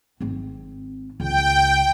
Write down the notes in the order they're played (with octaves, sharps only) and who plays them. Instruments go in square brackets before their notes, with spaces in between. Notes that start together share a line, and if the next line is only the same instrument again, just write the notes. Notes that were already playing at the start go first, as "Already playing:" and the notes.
[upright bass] G#1 C4
[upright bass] C#2 [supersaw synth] G5